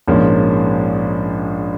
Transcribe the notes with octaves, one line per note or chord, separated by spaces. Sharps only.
A#1 G#2 F3 A#3 C#4